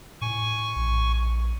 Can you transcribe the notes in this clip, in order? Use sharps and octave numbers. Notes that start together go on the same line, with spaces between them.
A2 G#5 C#6
A#1